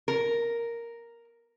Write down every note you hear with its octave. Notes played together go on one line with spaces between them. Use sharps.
A#4